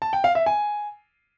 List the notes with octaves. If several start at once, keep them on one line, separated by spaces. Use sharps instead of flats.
A5
G5
F5
E5
G#5